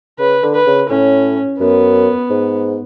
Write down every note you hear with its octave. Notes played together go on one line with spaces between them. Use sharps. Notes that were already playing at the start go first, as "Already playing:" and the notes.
C#3 B4
D3
B4
C#3
A2 C#4
F#2 B3
G#2